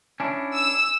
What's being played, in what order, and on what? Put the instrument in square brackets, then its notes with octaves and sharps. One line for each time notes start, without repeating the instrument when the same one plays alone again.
[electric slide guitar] C#4 D4 E4
[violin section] E6